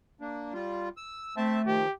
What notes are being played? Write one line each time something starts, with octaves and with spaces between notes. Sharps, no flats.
A#3 D4
G3 F4
E6
A3 C4 E5 A5
D#3 F3 G4